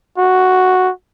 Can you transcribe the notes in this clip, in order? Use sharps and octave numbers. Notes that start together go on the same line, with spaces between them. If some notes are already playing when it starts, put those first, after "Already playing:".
F#4